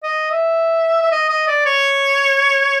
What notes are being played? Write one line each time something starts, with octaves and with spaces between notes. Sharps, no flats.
D#5
E5
E5
D#5
D#5
D5
C#5